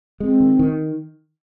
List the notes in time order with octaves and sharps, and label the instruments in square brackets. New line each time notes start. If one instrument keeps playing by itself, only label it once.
[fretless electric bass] G#3 [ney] C4
[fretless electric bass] D#3
D#3